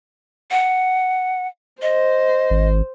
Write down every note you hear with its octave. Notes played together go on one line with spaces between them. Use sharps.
F#5
C5 D#5
G#1